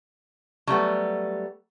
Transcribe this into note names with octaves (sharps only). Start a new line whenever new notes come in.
F#3 G3 A3 B3